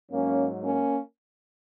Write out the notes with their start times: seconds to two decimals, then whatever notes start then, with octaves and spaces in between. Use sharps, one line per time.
0.11 G#2 F#3 A#3 C#4
0.62 A#3 C#4